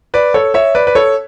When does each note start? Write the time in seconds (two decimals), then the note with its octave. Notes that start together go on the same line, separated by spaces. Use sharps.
0.14 B4 D5
0.34 A4 C#5
0.54 C#5 E5
0.75 B4 D5
0.87 B4
0.95 A4 C#5